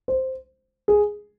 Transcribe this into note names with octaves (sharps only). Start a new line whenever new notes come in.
C5
G#4